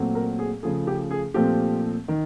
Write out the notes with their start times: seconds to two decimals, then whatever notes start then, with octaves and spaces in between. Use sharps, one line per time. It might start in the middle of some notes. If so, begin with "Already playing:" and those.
Already playing: A#2 F#3 A3 C4
0.15 A#4
0.39 G#4
0.62 C#3 F3 A3 G#4
0.87 G4
1.11 G#4
1.34 A#2 F3 A3 C4 G4
2.08 D#3